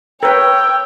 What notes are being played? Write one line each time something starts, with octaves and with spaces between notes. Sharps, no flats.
A#4 B4 C#5 G5 E6